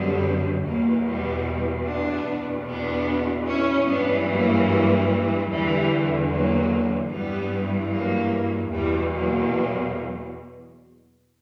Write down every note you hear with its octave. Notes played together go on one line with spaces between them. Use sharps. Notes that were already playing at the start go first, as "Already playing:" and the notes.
Already playing: F#2 D3 G3 B3
E2 B2 F#3 A#3
G3 B3
B3 D4
E2 B2
B3 D4
C#4 E4
G2 E3 B3 D4
F#3 A#3
E2 D3 E3 G3
F#3 A#3
G2 E3 G3 B3
F#3 A#3
E2 B2 E3 G3
F#3 A#3